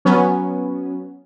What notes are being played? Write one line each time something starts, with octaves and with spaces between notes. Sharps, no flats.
F#3 B3 C#4